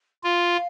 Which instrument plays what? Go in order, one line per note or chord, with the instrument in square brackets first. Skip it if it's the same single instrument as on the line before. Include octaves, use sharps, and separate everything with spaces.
[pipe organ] F4 [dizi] F5